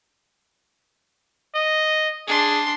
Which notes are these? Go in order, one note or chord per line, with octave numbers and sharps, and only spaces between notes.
D#5
D4 G#4 C6